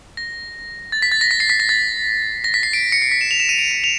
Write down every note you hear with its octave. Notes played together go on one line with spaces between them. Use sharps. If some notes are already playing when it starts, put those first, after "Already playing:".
A#6
A6
B6
A6
A#6
B6
C7
B6
A#6
A6
A#6
B6
C7
D7
C#7
C7
B6
E7
F7
E7
D#7
D7
D#7
F7